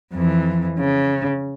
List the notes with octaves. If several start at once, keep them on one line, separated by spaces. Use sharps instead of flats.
F2 E3
C#3